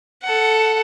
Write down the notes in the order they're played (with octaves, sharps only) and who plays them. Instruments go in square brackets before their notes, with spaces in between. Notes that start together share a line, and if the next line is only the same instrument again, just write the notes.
[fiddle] A4 F#5